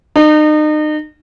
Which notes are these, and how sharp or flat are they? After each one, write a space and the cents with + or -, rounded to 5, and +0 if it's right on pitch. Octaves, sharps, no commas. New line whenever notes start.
D#4 -35